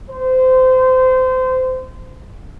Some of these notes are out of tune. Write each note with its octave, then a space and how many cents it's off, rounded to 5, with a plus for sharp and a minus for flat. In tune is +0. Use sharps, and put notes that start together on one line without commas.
C5 -25